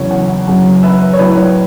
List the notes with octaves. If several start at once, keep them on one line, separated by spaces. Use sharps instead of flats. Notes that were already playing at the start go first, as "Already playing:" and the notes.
Already playing: E2 C#3 F#3 C#5
C#5 F#5
F#2 C#3 F#3
B4 E5
C#5
A2 F#3 B4
C#5